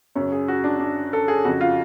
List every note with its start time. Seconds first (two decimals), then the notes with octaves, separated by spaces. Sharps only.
0.15 F#2 C#3 C#4
0.32 G#4
0.48 F#4
0.64 D4
0.80 D4
1.13 A4
1.28 G#4
1.44 F2 C#3 F#4
1.61 F4